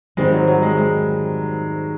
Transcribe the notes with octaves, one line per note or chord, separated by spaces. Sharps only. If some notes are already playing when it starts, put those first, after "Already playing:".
G#2 D#3 G3 G#3 C4
F#3
F#3
G#3
G#3